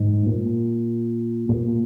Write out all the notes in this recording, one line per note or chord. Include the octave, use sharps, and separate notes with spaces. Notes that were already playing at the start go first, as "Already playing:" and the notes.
Already playing: G#2
A#2
A#2